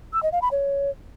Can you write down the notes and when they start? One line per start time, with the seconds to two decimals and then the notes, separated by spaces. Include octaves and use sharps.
0.13 E6
0.23 D#5
0.32 F5
0.42 B5
0.52 C#5